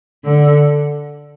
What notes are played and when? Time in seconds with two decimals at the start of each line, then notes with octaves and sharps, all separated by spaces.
0.24 D3